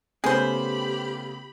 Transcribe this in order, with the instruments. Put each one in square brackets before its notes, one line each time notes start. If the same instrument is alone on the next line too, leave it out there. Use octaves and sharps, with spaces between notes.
[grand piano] C#3 A3 B3 [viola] G4 B5 [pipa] G#4 C5